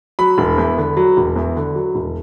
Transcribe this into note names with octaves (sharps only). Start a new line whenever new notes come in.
F#3 B5
E1
E2
D3
F#3
E1
E2
D3
F#3
E1